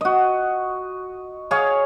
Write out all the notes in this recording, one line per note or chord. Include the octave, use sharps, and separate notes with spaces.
F#4 D#5
G#4 C#5 F5